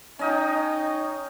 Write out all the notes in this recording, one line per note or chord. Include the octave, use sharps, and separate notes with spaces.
C#4 D#4 D#5 G5